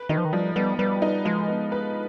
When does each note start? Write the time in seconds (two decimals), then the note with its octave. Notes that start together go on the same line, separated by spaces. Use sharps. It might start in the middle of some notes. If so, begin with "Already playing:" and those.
Already playing: B4
0.09 D#3 D#4
0.18 F3
0.25 D#3
0.33 F3 G3
0.56 G3 B3
0.79 G3 B4
1.02 D#4
1.25 F3 G#3
1.48 B3
1.72 B4